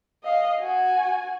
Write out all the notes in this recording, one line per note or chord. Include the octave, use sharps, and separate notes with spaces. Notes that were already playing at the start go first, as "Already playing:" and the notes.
D#5 F5
F#4 G#5